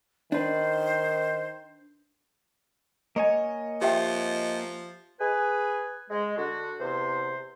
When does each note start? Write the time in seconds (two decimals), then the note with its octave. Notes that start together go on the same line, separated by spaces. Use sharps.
0.32 D#3 D4 B4 C5
3.16 A#3 C#5 D#5 G#5
3.82 F3 G4 E5 G5
5.20 G#4 B4 G#5
6.10 G#3
6.37 D3 F#4
6.79 E2 C3 C5